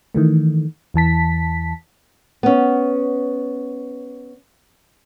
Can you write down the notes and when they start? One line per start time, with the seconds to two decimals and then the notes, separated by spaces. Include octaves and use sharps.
0.15 D#3 E3 A3
0.94 E2 E3 A5 B6
2.43 B3 C#4